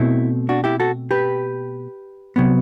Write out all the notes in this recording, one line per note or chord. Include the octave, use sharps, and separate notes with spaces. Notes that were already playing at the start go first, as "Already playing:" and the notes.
Already playing: B2 A3 C4 E4
D4 F#4
E4 G4
F#4 A4
G4 B4
C3 F#3 B3